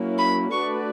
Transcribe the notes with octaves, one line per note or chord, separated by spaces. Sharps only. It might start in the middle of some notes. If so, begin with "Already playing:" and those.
Already playing: F#3 A#3 C#4 E4
B5
A3 D4 F#4 B4 D5 C#6